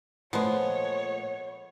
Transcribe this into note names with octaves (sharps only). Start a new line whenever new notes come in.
A#2 F3 G#3 A3 B3 C#5 F#5